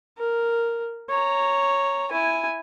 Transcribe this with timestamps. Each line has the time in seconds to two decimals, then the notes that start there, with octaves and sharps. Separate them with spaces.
0.18 A#4
1.09 C#5 A#5
2.11 E4 G#5